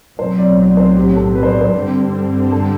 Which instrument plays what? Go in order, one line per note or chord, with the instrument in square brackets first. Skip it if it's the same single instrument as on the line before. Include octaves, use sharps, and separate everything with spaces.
[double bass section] B1 A2 F#3 C4 [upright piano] C5
[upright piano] D5
D5
C5
G4
A4
B4
C5
D5
C5
[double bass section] G2 D3 G3 C4
[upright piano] A4